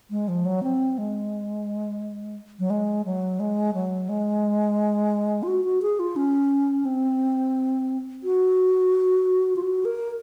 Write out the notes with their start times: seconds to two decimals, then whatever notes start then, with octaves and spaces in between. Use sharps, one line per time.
0.10 G#3
0.28 F3
0.46 F#3
0.63 C4
0.98 G#3
2.59 F#3
2.70 G#3
3.05 F#3
3.40 G#3
3.74 F#3
4.09 G#3
5.43 F4
5.48 F#4
5.65 F#4
5.82 G#4
5.99 F4
6.16 C#4
6.85 C4
8.24 F#4
9.56 F4
9.62 F#4
9.85 A#4